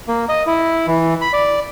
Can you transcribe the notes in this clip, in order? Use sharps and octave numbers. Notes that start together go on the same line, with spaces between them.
A#3
D#5
E4
E3
B5
D5